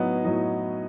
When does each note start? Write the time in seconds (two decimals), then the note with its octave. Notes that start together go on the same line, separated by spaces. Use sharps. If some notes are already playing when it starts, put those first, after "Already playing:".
Already playing: A2 F#3 B3 D#4
0.24 A2 F#3 B3 D#4